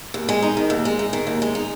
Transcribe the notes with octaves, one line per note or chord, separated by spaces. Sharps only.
D#2
G#3
D#4
D#3
D#2
G#3
D#4
D#3
D#2
G#3
D#4